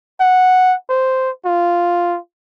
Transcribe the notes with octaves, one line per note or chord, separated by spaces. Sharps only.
F#5
C5
F4